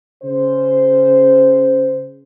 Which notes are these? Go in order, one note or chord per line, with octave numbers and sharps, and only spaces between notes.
C#3 C5